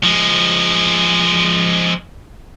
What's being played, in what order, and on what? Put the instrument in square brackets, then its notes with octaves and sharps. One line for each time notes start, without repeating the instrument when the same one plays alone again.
[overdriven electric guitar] F3 G#3